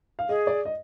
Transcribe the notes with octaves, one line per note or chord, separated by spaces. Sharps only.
F5
G#4 D#5
D5
D#5